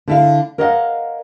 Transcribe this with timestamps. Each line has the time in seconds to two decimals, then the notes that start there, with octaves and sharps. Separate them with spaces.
0.08 D3 E4 F5
0.58 A#4 C#5 D#5 F5 F#5